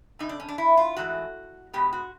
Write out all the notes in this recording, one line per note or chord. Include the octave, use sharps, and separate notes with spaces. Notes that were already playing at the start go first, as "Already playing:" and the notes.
F2 C3 D#4
D4
C#4
D4
E4
F4
G#2 E3 A3 F#4
B2 G#3 B3 G4
F#4